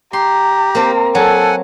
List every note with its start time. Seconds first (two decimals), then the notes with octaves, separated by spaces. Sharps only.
0.13 G4 A#5 C6
0.75 A#3 C4
1.15 F#3 A4 F#5 G#5